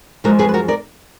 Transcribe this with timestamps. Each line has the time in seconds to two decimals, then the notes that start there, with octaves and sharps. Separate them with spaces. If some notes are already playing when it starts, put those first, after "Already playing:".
0.24 F#2 F3 G#3 F#4 A#4
0.39 G#4 B4
0.49 B4
0.54 F#4 A#4
0.68 A#4 D5